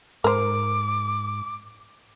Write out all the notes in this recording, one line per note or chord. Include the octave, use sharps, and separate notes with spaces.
G#2 A#4 C5 D6